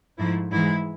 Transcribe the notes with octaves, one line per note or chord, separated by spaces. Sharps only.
G#2 F3 A3 E4
G#2 E3 G#3 E4